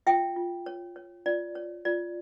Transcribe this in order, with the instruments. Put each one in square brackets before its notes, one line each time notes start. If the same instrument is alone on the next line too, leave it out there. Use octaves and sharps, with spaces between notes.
[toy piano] F4 E5 G5
F4
C#5
C#5
F4 D5
C#5
F4 D5